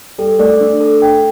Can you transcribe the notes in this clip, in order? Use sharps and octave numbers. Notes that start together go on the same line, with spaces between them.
G3 A4
A3 D5
D4
A4
G5